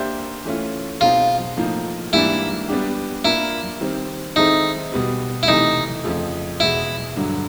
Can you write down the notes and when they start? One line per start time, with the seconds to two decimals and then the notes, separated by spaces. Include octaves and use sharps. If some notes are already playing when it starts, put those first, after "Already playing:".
Already playing: A#3 D4 G4 C5 E5
0.45 E3 A3 C#4 F4
1.00 B2 G#3 C4 D#4 F4 G#4
1.56 A2 F3 A#3 D#4
2.13 G#2 E3 G3 A#3 D4 E4
2.69 G3 B3 D4 G4
3.24 A#3 D4 E4 F4 A#4
3.81 D#3 G3 C4
4.36 D#3 G#3 C4 D#4 E4 A4
4.92 B2 G3 B3
5.43 E4
5.48 C3 E3 A3 D#4
6.04 F2 C#3 F3 A3
6.60 E2 B2 G#3 E4
7.16 G2 D3 F#3